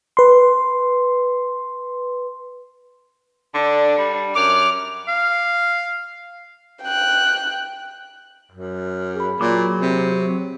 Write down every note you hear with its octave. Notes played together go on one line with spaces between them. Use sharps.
B4 C6
D3 D4
G3
F#2 D6 F6
F5
G5 F#6
F#2
G#4 B5
A#2 F#3 D6
C3